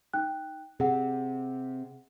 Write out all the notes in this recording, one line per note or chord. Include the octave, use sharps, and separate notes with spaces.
D#4 G5 F#6
C3 G#4 F#5